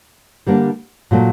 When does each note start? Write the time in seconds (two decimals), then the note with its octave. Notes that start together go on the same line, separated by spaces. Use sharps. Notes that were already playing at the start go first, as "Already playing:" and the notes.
0.47 D3 G3 A#3 D4
1.11 A#2 F#3 A3